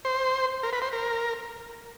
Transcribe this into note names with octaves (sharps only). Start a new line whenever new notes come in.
C5
A#4
B4
C5
A#4